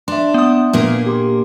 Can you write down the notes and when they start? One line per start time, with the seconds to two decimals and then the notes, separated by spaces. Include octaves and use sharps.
0.08 D4 E5 C6
0.34 B3 D#6
0.73 A#2 A#3 G#4
1.06 G4 C6